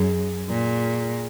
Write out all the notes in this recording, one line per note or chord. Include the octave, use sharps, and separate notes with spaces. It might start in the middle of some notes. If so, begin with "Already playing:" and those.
Already playing: F#2 G#4
A#2